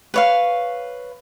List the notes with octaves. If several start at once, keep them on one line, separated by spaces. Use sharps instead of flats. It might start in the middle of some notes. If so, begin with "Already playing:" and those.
B4 C#5 F5